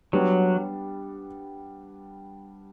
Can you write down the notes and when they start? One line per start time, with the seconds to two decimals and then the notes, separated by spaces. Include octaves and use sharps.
0.13 F#3 G3 B3 D4